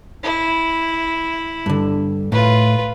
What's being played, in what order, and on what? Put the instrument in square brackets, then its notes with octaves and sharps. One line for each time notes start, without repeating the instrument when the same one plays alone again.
[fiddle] E4
[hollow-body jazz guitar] G2 D3
[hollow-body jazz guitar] A2 [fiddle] F4 B4